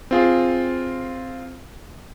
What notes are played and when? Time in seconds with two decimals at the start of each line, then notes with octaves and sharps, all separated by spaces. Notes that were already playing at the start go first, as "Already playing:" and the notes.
0.11 C4 F4 G#4